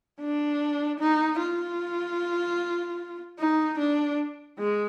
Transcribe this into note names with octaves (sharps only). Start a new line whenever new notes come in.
D4
D#4
F4
D#4
D4
G#3